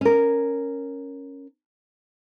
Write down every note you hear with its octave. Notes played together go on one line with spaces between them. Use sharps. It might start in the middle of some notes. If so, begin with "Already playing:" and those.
C#4 A#4